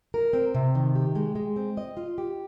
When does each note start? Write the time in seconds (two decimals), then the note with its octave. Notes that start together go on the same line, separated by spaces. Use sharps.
0.14 A#4
0.33 C4
0.55 C3
0.75 D#3
0.95 G4
1.15 G#3
1.35 G#3
1.56 C4
1.77 D#5
1.97 F4
2.18 G4